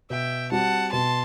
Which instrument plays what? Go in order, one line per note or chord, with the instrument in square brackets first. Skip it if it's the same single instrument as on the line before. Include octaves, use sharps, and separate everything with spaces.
[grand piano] B2 [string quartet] E5 G5
[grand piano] G3 C4 F#4 [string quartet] F#5 A5
[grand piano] B2 [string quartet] A5 C6